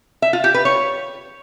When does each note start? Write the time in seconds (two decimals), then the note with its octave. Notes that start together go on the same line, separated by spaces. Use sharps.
0.22 E5
0.33 F4
0.44 G4
0.54 B4
0.65 C#5